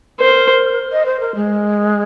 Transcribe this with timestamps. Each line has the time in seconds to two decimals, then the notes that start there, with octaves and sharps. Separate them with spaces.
0.19 A#4 C5
0.92 D#5
1.06 C5
1.20 A#4
1.35 G#3